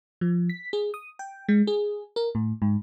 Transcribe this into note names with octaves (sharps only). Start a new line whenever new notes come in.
F3
B6
G#4
D#6
G5
G#3
G#4
A#4
A2
G#2